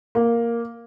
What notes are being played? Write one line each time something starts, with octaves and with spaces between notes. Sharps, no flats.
A#3